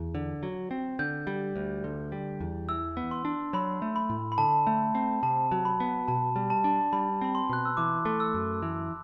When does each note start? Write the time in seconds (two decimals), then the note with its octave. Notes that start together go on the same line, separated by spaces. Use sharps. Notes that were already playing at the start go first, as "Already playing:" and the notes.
Already playing: E2
0.15 D3
0.43 F#3
0.71 C4
0.99 D3 G6
1.27 G3
1.56 D2
1.84 D3
2.12 G3
2.40 E2
2.69 E3 E6
2.97 B3
3.11 C6
3.25 D4
3.53 F#3 B5
3.82 A3
3.96 B5
4.10 A2
4.32 B5
4.38 D3 A5
4.67 A3
4.95 C4
5.23 C3 A5
5.52 F#3
5.65 B5
5.80 B3
6.08 B2 A5
6.36 G3
6.50 A5
6.64 D4
6.93 G3 B5
7.21 C4 B5
7.35 C6
7.49 B2 F#6
7.65 E6
7.77 E3 D6
8.05 A3
8.20 E6
8.34 F#2
8.62 E3